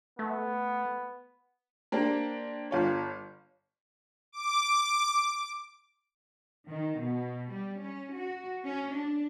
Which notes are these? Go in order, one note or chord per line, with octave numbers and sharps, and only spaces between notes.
A3 B3
A#3 D4 G4 C5
G1 F4 C#5
D6
D#3
B2
G3
C#4
F#4
C#4
D4